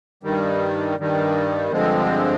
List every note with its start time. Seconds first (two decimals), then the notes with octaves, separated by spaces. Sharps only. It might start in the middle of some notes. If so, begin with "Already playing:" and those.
0.23 G2 D#3 G3
0.98 G2 D#3 G3
1.72 G2 D3 F3 G#3 C4